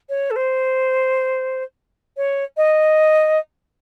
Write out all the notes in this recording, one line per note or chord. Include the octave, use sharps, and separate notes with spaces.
C#5
A4
C5
C#5
D#5